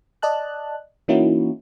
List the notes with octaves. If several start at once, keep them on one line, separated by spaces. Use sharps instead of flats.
D5 D#5 A5 F#6
E3 A#3 C#4 D#4 E4 F#4